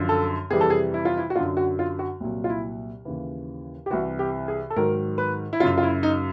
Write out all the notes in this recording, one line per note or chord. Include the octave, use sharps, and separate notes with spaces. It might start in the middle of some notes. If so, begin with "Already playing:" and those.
Already playing: F#2 D3 F3
A4
F2 C3 E3 G3 G#4
A4
G#4
E4
F4
E4
F#4
F#2 D3 F#3 F4
F#4
F4
F#4
C2 A#2 F#3
F4
E4
D#2 C#3 E3
G4
C2 C3 E3 F#4
G4
G#4
A4
G#2 D#3 F#3 A#4
B4
E4
F#2 C#3 F#3 F4
F4
E4
D#4